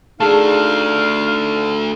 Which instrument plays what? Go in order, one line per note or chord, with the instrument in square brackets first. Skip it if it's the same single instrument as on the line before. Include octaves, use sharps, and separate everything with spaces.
[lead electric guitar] A3 D4 [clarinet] D#4 [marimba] G#4 A5 [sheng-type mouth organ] F5